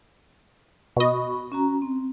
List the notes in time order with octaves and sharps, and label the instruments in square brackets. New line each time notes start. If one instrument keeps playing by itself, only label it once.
[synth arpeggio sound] B2 D#5 [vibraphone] F#4 B5 C#6
[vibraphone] C#4 F#4 A#5
C4